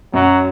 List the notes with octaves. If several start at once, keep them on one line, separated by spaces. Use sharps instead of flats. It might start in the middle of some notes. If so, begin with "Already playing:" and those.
F#2 F#3